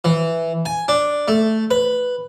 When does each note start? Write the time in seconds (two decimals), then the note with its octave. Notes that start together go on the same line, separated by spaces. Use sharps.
0.04 E3
0.66 G#5
0.88 D4
1.28 A3
1.71 B4